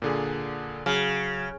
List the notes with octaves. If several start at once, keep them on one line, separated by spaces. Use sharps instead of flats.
A#2 D3 G#4
C#3 F#3 F6